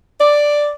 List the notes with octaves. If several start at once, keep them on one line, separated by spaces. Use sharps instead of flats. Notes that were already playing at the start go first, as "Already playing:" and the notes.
D5